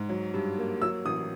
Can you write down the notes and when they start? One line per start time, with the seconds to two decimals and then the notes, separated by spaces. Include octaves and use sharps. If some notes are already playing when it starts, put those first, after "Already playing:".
Already playing: G#2
0.09 F#3
0.34 G2
0.58 A#3
0.82 F#3 E6
1.05 A1 D#6